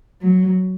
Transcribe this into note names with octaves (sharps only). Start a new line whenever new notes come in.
F#3